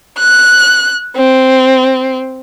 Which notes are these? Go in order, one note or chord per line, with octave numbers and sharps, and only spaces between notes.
F#6
C4